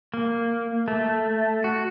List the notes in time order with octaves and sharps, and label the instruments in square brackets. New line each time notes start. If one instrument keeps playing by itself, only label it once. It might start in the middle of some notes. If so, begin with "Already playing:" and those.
[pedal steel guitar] A#3
A3
F#4